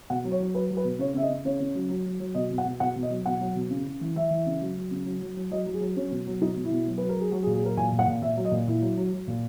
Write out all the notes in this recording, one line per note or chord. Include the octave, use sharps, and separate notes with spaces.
B2 F#5
F#3
C#5
F#3
F#3 B4
F#3
B4
B2
C#3 C#5
C#3 E5
D#5
C#3
C#3 C#5
C#3
F#3
F#3
F#3
F#3
B2 D#5
B2
F#5
B2
B2 F#5
B2
D#5
F#3
B2 F#5
F#3
B2
C#3
C#3
E3
E3 E5
E3
C#3
F#3
F#3
C#3
F#3
F#3
F#3
F#3 D#5
F#3
G#4
F#3
F#3 C#4
B2
F#3
B2 D#4
B2
E4
B2
F#3
F#3 B4
A#4
F#3 G#4
F#3 F#4
G#4
A#2
G#4
F#3 A#4
A#2 G#5
A#2
F#5
A#2
A#2 E5
F#3
D#5
A#2
A#2 E4
F#3
F#3
F#3
A#2